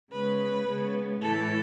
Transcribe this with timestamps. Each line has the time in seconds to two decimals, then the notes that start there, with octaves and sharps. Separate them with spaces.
0.11 C#3 G#3 B3 B4
0.66 C#3 G#3 B3
1.21 A2 E3 A3 A4